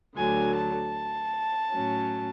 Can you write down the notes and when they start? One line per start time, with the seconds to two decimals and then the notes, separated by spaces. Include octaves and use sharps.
0.16 D2 D3 F#3 G#5
0.56 A5
1.73 A2 F#3 C#4